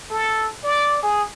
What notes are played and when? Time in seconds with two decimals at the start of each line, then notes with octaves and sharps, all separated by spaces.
0.10 A4
0.64 D5
1.03 G#4